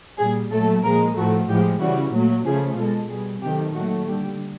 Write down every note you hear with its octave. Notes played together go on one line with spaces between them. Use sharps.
A#2 G3 G#4
A#2 F#3 A3 A4
A#2 F3 G#3 A#4
A2 F3 A3 F#4
A2 F3 G#3 G4
C#3 E3 G3 F#4
A#2 F#3 A3
C#3 F3 A3 G#4
B2 G#3 A4
B2 G3 G#4
C3 D#3 F#3 A3 G4
A#2 F#3 A3 F#4
D3 G3 G4